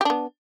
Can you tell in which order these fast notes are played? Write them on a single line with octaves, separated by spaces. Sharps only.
G4 D4 B3